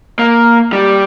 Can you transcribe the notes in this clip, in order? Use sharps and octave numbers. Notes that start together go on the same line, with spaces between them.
A#3
G3